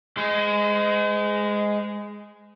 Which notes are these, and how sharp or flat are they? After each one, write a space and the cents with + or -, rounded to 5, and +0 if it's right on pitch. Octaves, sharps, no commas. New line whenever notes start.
G#3 +0 C5 -40